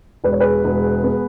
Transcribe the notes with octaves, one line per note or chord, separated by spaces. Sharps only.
E1 B4
C#5
G#4 B4
E1
B3